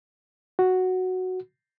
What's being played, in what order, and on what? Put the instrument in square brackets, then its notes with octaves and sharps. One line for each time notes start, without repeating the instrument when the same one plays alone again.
[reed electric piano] F#4